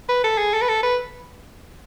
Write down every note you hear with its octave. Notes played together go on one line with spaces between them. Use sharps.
B4
A4
G#4
A4
B4
A4
B4